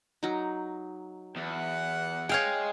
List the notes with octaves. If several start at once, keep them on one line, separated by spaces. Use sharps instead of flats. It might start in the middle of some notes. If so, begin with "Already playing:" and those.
F#3 D#4
E2 F#5
G#3 G#4 C#5 F5 G5